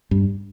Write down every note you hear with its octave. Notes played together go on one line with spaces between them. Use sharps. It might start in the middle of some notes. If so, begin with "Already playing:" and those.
G2